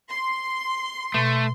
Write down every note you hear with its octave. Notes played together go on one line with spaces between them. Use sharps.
C6
B2 A3